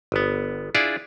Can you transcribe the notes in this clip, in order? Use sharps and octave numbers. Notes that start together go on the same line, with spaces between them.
G1 B3
D4 E4 F4 G#4 D5